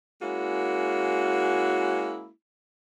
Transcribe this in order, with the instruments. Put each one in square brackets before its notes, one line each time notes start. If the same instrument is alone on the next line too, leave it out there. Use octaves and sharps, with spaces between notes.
[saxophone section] G#3 A#3 C#4 E4 F#4